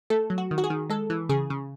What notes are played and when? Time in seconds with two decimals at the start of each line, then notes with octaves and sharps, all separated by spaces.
0.10 A3 A4
0.30 F#3
0.38 F#4
0.51 D#3
0.58 F#4
0.64 G#4
0.70 D#3
0.90 G#3 A4
1.10 E3
1.29 C#3 G#4
1.50 C#3